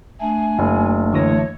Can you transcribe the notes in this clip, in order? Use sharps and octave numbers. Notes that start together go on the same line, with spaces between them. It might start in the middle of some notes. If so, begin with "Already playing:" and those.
A3 D4 G#5
F#1
D2 E3 C#5 A#6